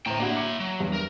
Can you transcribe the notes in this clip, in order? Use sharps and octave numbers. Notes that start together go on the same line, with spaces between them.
A2 C4 G5 A#5
A#3 D4 E4 F#4
A#5 D6 C#7
F#3
E2 G2
A#4